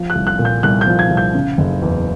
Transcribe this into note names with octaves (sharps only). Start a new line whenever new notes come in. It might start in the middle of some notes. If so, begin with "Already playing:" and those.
Already playing: F3
F#6
C2
F#6
A#2
G6
C2 F#6
G6
F3
G#6
C2
G6
C#3
F#1
E2